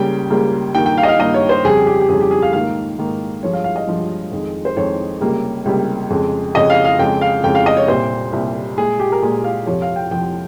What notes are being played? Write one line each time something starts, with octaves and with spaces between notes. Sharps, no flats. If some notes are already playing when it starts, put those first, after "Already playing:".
Already playing: C#2 C#3 G3 A#3 G5
C#2 C#3 G3 A#3
G2 D#3 A#3 G5
G5
F5
D#5
F5
G2 D#3 A#3 D#5
C#5
C5
F2 C#3 G3 G#4
G4
G4
F2 C#3 G3 G#4
G4
G#4
F5
G#2 D#3 A#3 F5
G#2 D#3 A#3
G2 F3 G#3 C#5
F5
F5
D#5
G2 F3 G#3
F2 D#3 G#3
C5
F2 D#3 G#3 C#5
C#2 C3 G3 A#3
C#2 C3 G3 A#3
F2 C#3 G#3
F2 C#3 G#3 D#5
F5
F5
F2 C#3 G#3 G5
F5
F2 C#3 G#3 G5
F5
D#5
C#5
C2 A#2 G3 C5
C2 A#2 G3
A#2 G#3 G#4
G4
A#4
A#2 G#3 G#4
F5
F2 C3 F3 C#5
F5
G5
F2 C3 F3 G5